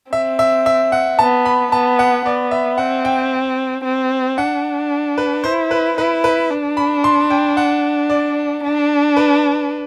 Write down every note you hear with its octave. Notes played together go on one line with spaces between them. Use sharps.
C4 E5
E5
E5
F#5
B3 A5
B5
B3 A5
F#5
B3 D5
E5
C4 F#5
G5
C4
D4 F#5
B4
E4 C5
B4
E4 B4
B4
D4
B5
C6
G5
F#5
D5
D4
B4